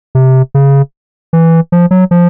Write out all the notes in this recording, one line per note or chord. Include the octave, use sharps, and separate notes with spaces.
C3
C#3
E3
F3
F#3
F3